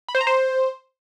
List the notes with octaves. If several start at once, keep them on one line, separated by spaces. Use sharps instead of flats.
B5
C5
A#5
C5